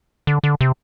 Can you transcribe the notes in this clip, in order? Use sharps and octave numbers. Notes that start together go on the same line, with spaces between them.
D3
D3
C3